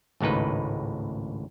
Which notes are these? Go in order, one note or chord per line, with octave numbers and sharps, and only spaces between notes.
G#1 C#2 A2 D#4 B4